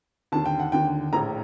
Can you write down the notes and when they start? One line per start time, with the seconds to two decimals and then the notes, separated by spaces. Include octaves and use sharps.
0.32 D#2 D3 A5
0.46 G5
0.59 F#5
0.72 D#2 D3 G5
1.13 A#1 A2 A#5